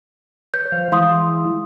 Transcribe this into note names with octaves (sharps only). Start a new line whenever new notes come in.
B4 C#5 G6
F3 C5 F5
E3 G#3 E4 F5 C6 D#6